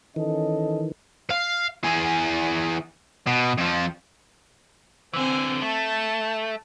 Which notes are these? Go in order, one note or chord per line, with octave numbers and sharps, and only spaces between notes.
D#3 E3 C#4 A4 D#5
F5
E3 G#4
B2
F2 F3
D3 E3 C4 G#5
A3 A5